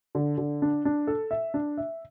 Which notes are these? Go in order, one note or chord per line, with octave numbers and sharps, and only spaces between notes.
D3
D3
D4
D4
A4
E5
D4
E5